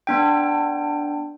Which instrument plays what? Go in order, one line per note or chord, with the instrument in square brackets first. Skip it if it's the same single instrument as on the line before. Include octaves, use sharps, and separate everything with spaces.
[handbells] B3 D4 G5